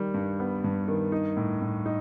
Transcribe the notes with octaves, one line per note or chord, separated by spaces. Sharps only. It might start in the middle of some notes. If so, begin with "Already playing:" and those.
Already playing: D#3 G3
G2
B3
G2
D#3
D#4
A2
A2
D#4